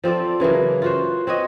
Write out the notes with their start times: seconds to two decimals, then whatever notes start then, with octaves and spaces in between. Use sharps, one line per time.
0.04 F3 C4 A4 D5
0.40 C#3 E3 F#3 A#3
0.82 F4 F#4 C5
1.27 C4 F#4 C#5 D#5